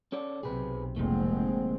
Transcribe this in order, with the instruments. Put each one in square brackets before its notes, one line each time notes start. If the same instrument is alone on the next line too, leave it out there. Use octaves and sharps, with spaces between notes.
[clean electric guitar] C#4 A4 D5
[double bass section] B1 C3 [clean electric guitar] G#4 B4
[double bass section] F1 G#3 C4 [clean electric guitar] A#2 D#3 A3